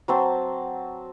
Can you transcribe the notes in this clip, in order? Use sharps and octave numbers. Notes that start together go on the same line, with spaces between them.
F#3 C4 A5